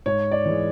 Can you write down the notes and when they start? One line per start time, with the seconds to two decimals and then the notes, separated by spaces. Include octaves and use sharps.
0.06 G#2 C#5
0.31 D5
0.46 E3 G#3